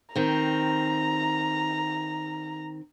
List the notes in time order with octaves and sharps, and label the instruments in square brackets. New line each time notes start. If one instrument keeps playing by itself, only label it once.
[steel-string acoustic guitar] D#3 C4 [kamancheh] A#5